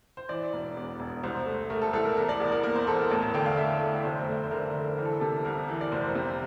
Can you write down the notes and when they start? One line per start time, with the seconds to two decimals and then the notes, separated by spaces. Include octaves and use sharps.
0.17 C5
0.29 E3 D5
0.53 E1
0.76 E2
1.00 E1
1.23 C2 C5
1.46 A3
1.70 A3 A#4
1.82 A4
1.93 C2 A4
2.05 A#4
2.17 E2 A#4
2.29 D5
2.40 E2
2.52 A#4
2.63 A#3 A#4
2.76 C5
2.87 E2 A4
2.99 A#4
3.10 A1 A5
3.23 A5
3.34 D3 G5
3.46 F5
3.57 A3 E5
3.81 D3
4.04 F1 C5
4.28 A3
4.44 C5
4.51 D3 A#4
4.75 D3
4.98 E3 A#4
5.05 A4
5.20 C3 A4
5.45 C2 A#4
5.68 E3
5.81 D5
5.92 F1 C5
6.15 C3